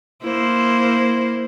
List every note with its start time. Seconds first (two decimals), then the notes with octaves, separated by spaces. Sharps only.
0.23 A#3 E4 C5